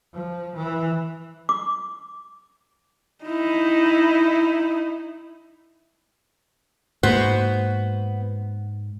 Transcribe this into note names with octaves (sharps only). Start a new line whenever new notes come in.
F3
E3
D6
D#4 E4
G#2 A#3 B3 F#4 C5